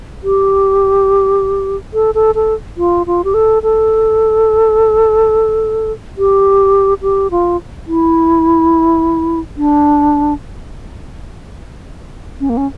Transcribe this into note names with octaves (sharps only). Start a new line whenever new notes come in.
G4
A4
A4
A4
F4
F4
G4
A4
A4
G4
G4
F4
E4
D4
C#4
A#3
C#4